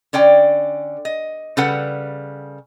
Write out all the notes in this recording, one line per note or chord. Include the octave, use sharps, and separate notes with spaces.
D3 C#4 D5 G5
D#5
C#3 G3 A4 B4 F#5